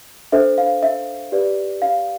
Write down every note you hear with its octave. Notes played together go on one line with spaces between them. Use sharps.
D4 A4 C5 E5
F5
E5
G4 B4 D5
F5